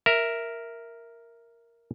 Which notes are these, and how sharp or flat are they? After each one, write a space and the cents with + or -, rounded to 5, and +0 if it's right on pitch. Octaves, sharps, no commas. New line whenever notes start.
A#4 +0 E5 +0